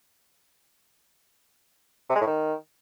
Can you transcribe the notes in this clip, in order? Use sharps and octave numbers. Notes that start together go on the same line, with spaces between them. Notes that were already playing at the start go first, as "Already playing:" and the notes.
C3
G#3
A2
D#3